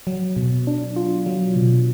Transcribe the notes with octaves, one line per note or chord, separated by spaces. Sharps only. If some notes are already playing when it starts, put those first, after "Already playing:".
F#3
B2
D4
F4
F#3
B2